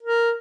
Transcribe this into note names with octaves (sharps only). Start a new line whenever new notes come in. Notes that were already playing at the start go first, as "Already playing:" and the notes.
A#4